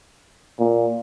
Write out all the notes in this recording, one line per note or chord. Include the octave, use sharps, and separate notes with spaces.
A#2